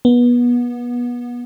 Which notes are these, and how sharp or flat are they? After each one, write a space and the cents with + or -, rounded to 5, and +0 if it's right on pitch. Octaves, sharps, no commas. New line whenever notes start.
B3 -25